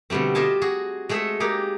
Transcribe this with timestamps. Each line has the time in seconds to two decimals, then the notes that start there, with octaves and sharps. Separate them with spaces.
0.10 B2 D3 G3 A3 C4
0.35 F4 G4 C5 D#5 G#5 A5
0.62 F#4 G#4
1.09 G#3 A3 G#4 A4 C5 E5
1.40 G#3 A#3 D#4 G4 G#4